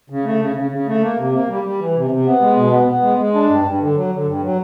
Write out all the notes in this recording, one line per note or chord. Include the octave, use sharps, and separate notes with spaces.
C#3
A3
C#3
C#3
C#3
A3
A#3
C3
A#3
G3
G3
E3
C3
C3
B3
G#3
B2
B3
B3
G#3
G#3
D4
G2
G2
D3
F#3
D3
G2
F#3